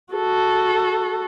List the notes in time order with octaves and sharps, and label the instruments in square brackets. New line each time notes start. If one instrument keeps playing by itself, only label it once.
[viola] F#4 A4